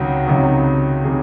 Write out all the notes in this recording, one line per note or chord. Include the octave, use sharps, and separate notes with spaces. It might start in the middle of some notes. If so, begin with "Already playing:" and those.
Already playing: C#2 C3 D#3 F#3 F#4
C#2 C3 D#3 F#3
C3 D#3 F#3 G#4